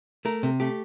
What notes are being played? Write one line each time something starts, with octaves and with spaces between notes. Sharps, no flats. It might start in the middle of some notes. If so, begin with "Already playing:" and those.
A3 A#4
C3
A3 G4